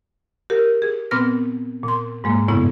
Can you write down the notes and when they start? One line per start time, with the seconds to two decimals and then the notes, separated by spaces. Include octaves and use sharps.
0.50 G4 A#4
0.82 G#4
1.11 A#2 B3 C4 B4 F6 A#6
1.84 A#2 C6
2.24 G#2 G#3 A#3
2.48 F#2 A2 C#3 B3 E4